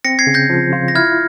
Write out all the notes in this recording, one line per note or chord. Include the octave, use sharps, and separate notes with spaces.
C4 A#6 C#7
G#6 C7
C#3
G6 A#6
F3
F4
A#6
E4 F6 G#6